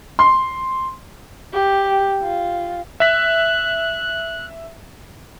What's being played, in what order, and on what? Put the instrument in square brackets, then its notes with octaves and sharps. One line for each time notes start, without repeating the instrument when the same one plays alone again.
[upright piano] C6
[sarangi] G4
F4
[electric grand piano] E5 B6 [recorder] F#6